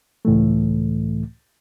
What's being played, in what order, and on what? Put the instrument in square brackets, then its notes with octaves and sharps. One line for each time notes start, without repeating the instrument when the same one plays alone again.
[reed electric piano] C#2 A2 E3 A3